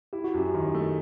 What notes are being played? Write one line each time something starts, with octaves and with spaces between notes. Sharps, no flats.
E4 G4
F#4
F#2 G4
D#3
A3